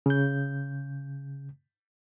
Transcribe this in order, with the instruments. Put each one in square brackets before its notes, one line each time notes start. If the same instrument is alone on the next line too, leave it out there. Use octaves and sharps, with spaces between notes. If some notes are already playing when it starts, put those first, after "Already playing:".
[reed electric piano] C#3 G6